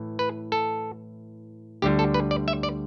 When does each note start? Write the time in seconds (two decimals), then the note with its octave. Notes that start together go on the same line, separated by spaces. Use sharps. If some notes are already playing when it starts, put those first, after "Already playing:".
Already playing: A2 E3
0.19 B4
0.52 A4
1.82 D2 D3 G3 G4
1.99 A4
2.14 B4
2.31 D5
2.48 E5
2.63 D5